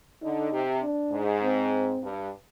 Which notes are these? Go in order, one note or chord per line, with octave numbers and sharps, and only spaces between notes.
D3 D#4
C3
D4
G#2
C4
G2